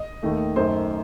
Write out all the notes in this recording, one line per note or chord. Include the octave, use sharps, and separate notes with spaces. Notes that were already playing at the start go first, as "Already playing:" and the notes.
Already playing: D#5
D#2 D#3 A3
F#2 D#3 A3 D#4 C5